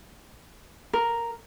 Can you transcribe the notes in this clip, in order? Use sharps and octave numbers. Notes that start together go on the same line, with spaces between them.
A#4